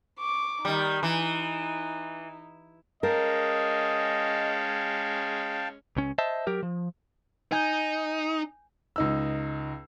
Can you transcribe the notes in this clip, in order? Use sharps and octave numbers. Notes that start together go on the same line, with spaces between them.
C#6 D6
D#3 G3 D#4
E3
G#3 C#4 A#4 D#5 F5 G5 A5
C#2 C#4
C5 D#5 E5 A5
F#3 G4 A#4
F3
D#4 G#5 G6
C#2 D#4 E6